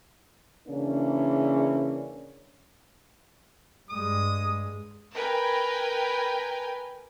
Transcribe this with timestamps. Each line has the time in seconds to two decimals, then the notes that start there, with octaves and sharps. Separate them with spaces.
0.68 C#3 E3 A#3 C#4 D4
3.90 G2 G#3 D#6
5.13 A#4 B4 G5 G#5